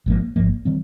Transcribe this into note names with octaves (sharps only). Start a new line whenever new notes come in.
G#1 G#2 F3 A#3
G#1 G#2 F3 A#3
D#3 G3 C4